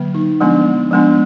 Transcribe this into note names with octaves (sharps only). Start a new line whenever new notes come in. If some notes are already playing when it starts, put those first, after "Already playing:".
Already playing: D3 F#3 A#3
D#4
F3 G#3 B3 D4
F3 G#3 B3 D4